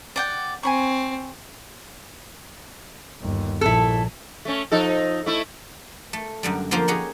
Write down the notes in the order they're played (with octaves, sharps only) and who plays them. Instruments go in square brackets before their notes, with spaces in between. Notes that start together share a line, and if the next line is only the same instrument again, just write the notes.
[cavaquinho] D5 F#5 G5
[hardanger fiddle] C4 [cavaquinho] G#5 B5 C#6
[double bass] G1 D#2
[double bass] A#1 [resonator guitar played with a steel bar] E4 A4
[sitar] A3 C#4
F3 D#4 A4
A3 E4
[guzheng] A3
F#2 D3 G3
D3 F3 A#3 F4 C5
G4 G#4 C#5 D#5 F#5